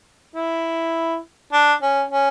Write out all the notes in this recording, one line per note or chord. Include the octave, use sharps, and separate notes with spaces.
E4
D4
C#4
C#4